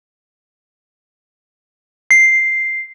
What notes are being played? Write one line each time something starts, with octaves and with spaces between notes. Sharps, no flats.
C7